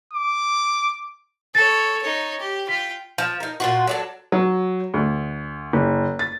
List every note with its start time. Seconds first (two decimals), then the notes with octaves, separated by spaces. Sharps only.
0.13 D6
1.55 A4 C#5 A6
2.02 D#4 C#5
2.40 G4
2.69 F4 G5 B6
3.18 F3
3.40 D#4 A#4
3.60 A#2 F4 F#4
3.87 F#3 D4 A4
4.32 F#3
4.94 D2
5.73 F#1
6.19 A6